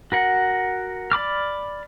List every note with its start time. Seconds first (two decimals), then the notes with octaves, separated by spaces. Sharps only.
0.12 F#4 A#4 F#5
1.12 D5 B5 D6 F6